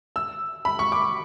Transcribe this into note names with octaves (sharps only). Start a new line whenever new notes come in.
E6
B5
C#6
D6